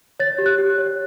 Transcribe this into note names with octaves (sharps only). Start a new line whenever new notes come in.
C#5 A6
G4
F#6
G4
C#5